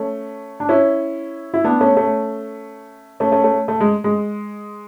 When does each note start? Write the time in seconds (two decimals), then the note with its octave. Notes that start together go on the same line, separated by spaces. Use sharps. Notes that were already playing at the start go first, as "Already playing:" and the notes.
Already playing: A3 C#4
0.60 D4
0.69 C#4 E4
1.54 E4
1.64 B3 D4
1.81 A3 C#4
1.97 A3 C#4
3.20 A3 C#4
3.32 A3 C#4
3.44 A3 C#4
3.68 A3
3.81 G#3
4.04 G#3